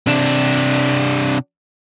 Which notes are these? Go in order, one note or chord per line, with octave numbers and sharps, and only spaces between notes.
C3 D4